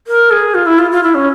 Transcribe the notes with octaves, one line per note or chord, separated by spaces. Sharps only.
A#4
G#4
F4
E4
F4
F4
E4
C#4